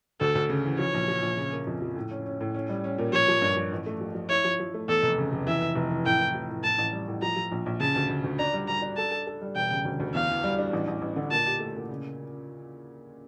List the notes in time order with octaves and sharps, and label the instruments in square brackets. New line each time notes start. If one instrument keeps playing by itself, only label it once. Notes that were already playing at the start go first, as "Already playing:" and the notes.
[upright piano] D2 [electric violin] A4
[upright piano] D2
C#3
E3
[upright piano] F3 [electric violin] C#5
[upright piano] A#1
F3
A#1
C#3
A#3
F2
F3
A2
C#4
C#4
A2
C#4
G3
C#4
A#2
[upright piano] F3 [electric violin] C#5
[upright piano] F3
G2
F3
A1
A3
F3
F3
[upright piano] E4 [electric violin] C#5
[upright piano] F3
F3
A3
[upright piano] E2 [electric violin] A4
[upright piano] F1
C#3
F1
[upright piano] E3 [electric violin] E5
[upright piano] E3
F1
E3
[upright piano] A2 [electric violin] G5
[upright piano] A2
F3
A2
[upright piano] A2 [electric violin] A5
[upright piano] A1
G3
A2
[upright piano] F3 [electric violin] A#5
[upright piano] F3
A#1
A#1
[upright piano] C#3 [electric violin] A5
[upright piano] D2
D2
D2
[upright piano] D4 [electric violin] A#5
[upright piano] G3
[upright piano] G3 [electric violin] A#5
[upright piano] D4
[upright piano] A4 [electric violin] A5
[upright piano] A4
A4
G3
[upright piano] E1 [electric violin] G5
[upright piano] C#3
D2
D2
[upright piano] E2 [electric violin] F5
[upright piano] E3
G3
D4
A1
A1
A1
D3
[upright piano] A#2 [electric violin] A5
[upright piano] G4
A3
A#2
C#3